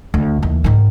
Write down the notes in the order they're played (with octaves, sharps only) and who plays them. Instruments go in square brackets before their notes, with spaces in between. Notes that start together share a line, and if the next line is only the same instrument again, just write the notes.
[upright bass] D2
D#2 E3
G#2 D#3